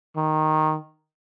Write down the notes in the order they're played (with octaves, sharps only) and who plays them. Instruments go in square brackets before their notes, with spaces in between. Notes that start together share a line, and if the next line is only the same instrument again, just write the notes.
[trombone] D#3